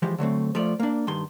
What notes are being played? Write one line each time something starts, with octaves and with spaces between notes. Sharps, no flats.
E3 F3 G#3 G4
D3 F#3 A3 C4
F3 A3 F4 D5
A#3 D4
G2 D#3 C6